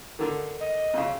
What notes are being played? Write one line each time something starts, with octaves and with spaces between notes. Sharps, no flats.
D3 D#3
D#5
F2 C#3